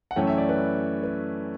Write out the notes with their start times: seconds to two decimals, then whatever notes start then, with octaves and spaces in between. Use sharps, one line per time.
0.11 F#5
0.16 F#2 E3 A3 C#4 G5
0.27 E5
0.38 D5
0.49 B4
1.03 B4